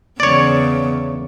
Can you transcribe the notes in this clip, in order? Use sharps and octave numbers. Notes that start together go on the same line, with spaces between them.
E2 C#3 C#5 D5